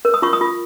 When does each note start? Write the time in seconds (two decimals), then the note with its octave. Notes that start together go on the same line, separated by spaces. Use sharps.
0.05 A#4
0.14 D#6
0.22 F4 C#6
0.33 D#6
0.41 F4